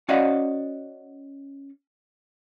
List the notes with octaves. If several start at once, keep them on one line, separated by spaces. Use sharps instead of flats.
C#4 F#4 D5 D#5 F5 F#5